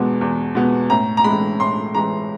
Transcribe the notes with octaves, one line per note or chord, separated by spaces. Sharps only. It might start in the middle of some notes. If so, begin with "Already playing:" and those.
Already playing: E2 B2 G#3 B3
E2
B2 G#3 B3
A2 A#5
A#5
E3 G#3 B5
A2 C6
E3 G#3 A#5